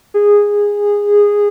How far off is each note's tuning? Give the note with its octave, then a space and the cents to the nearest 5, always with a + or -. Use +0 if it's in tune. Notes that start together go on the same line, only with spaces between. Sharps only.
G#4 -15